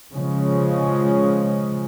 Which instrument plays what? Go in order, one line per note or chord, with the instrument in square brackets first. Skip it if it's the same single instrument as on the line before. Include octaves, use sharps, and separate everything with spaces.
[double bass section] C#3 F3 G#3 C#4